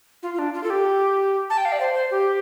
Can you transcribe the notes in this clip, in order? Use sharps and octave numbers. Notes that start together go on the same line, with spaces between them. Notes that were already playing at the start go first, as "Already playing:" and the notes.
F4
F4
D4
F4
A4
G4
A5
G5
F5
D5
C5
C5
G4